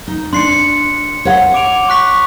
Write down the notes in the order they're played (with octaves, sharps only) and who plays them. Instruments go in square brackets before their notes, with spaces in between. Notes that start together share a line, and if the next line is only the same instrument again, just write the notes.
[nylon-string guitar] D#4
[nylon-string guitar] D4 [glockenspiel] C6 C7 C#7
[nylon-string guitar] C#5 F#5
[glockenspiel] D6 D7 F7
C#6 F#6 B6